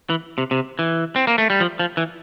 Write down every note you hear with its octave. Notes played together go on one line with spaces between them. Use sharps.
E3
C3
C3
E3
C4
A#3
A3
G3
F3
F3
E3